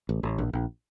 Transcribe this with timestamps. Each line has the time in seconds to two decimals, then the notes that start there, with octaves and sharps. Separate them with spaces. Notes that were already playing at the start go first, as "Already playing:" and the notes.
0.09 A1
0.23 A1
0.38 A#1
0.53 A#1